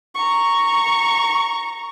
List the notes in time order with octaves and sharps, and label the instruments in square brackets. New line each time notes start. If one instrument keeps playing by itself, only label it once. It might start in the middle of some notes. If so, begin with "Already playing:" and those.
[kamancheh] A#5 C#6